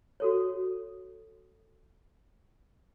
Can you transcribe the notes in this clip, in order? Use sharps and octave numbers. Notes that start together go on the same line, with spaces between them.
F#4 A4 C#5